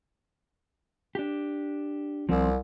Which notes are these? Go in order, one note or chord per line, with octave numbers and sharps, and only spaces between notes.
D4 G4
C2 F3 C4